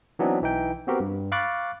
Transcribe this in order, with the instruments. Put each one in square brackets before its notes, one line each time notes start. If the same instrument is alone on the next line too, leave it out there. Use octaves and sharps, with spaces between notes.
[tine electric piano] E3 F#3 B3 C4 D4 D#4
B1 E3 D#4 G5
B3 C4 F#4 G4 A#4 B4
G2
F5 B5 C#6 D6 F#6 A6